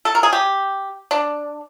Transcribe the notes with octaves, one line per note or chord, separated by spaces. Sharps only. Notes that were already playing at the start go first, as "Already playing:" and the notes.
A4
A#4
G#4
G4
D4